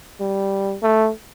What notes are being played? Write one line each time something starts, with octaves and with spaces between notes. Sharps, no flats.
G3
A3